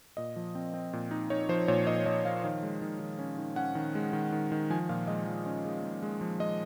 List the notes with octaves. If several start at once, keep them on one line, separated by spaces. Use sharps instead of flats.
A#2 D#5
F3
C4
C4
A#2
D#4
D#4 C#5
F3 C5
A#2 C#5
A#2 D#5
F3 D#5
F3 F5
D#3 F5
G#3
D#3
D#3
C#4
D#3
C#4 F#5
D#3
G#3
D#3
D#3
D#3
F3 G#5
A#2 F5
G#3 D#5
F3
C#4
G#3
G#3
G#3
F3
G#3 D#5